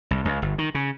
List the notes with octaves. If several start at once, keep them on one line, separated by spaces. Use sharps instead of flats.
C2
C#2
G1
D#3
C#3